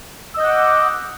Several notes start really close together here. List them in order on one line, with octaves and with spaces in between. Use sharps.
E6 D#5 G6 F#5 D6